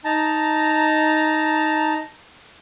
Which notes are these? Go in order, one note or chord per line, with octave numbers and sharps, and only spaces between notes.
D#4 A5 A#5